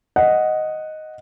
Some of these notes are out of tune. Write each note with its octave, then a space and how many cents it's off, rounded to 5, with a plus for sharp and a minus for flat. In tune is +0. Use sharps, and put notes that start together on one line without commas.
D#5 +0 F#5 +0